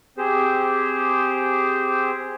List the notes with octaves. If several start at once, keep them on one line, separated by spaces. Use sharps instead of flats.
C4 G4 G#4 C5